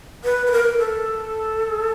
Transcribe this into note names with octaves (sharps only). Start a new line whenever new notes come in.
B4
B4
A#4
A4